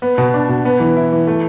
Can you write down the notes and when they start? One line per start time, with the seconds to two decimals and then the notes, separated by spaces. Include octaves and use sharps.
0.02 B3
0.18 B2
0.34 D4
0.49 B2
0.65 B3
0.80 E3
0.97 E4
1.12 E3
1.27 A3